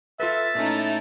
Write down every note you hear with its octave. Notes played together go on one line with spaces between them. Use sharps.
F4 A4 B4 E5 A6
A#2 A3 C#4 D#4 E4